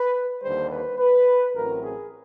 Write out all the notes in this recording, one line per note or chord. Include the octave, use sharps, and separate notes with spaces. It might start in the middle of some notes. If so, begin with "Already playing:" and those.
Already playing: B4
D#2 D3 G3 C5
B4
B4
A1 A2 F#3 A3 C4 A#4
G#4